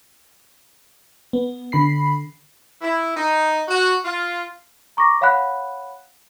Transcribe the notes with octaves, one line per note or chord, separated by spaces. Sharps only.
B3
D3 B5 C7
E4
D#4
F#4
F4
A#5 C#6 D6 A#6
C#5 F5 F#5 B5 F#6